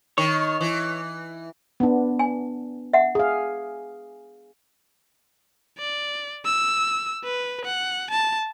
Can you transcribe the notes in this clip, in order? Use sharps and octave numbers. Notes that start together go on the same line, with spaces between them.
D#3 C#5
E3
B3 D4
G#5
E5 F#5
G#4 F5
D5
E6
B4
F#5
A5